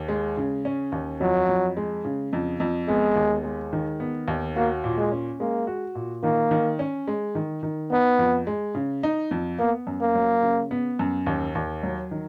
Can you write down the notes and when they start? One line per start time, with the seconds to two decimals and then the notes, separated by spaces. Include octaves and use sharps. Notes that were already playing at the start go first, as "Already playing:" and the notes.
Already playing: D#2
0.08 G#3
0.37 C#3
0.65 C#4
0.92 D#2
1.21 F2 F#3
1.49 F2
1.77 G#3
2.05 C#3
2.33 F2
2.60 F2
2.88 G#3 B3
3.16 D#2
3.44 G#3
3.73 D#3
4.00 B3
4.28 D#2
4.56 A#3 F#4
4.84 A#2
4.98 G#3
5.12 C#4
5.40 G#3 A#3
5.67 F#4
5.95 A#2
6.23 D#3 A#3
6.51 D#3
6.79 C#4
7.08 G#3
7.35 D#3
7.63 D#3
7.92 B3 D#4
8.19 F2
8.47 G#3
8.75 C#3
9.03 D#4
9.31 F2
9.58 A#3 B3
9.87 F#2
10.01 A#3
10.15 F#3
10.42 C#3
10.71 B3
10.99 F#2
11.27 D#2
11.55 D#2
11.83 F#3
12.11 D#3